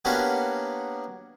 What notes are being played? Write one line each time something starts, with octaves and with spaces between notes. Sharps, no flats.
A#3 B3 C#4 D4 F#4 G4